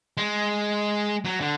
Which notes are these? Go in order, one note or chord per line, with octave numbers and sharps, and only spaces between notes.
G#3
F#3
D3